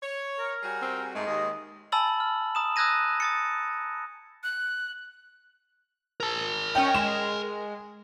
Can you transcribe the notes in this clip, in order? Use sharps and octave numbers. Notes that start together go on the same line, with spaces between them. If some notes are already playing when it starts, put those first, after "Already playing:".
C#5
A#4
G3 F#4 G#4
C4
G#2 G#3 A3
D#2 D#5
G#5 A5 B5 E6 A6 F#7
F6
A#5 D#6 E7
D#6 E6 F#6 G#6 A#6 D#7
D#6 A6 C#7
F#6
A#4 A5
C#4 C#5 D#5 G5
G#3 E7